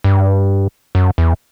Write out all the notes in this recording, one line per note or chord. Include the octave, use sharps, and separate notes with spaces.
G2
F#2
E2